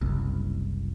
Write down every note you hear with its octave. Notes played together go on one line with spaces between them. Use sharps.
F#1 C2